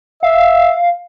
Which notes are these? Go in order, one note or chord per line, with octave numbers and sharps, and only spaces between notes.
E5 F5